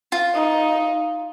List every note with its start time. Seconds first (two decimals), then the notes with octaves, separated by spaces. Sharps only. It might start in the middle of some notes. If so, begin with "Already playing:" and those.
0.12 F4
0.34 D#4